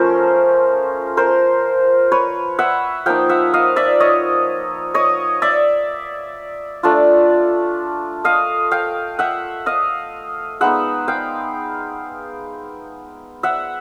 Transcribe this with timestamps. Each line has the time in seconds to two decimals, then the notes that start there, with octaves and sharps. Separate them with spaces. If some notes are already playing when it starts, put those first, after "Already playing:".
Already playing: F3 A3 C#4 A#4 C5
1.17 A#4 C5
2.12 B4 C#5
2.59 E5 F#5
3.06 F3 A#3 D#4 F5 G5
3.29 E5 F#5
3.54 D#5 F5
3.76 D5 E5
4.00 C#5 D#5
4.94 C#5 D#5
5.42 D5 E5
6.83 A3 D4 F4
8.24 D#5 F5
8.71 F5 G5
9.19 E5 F#5
9.66 D#5 F5
10.61 G#3 B3 D#4 E5 F#5
11.08 F5 G5
13.43 E5 F#5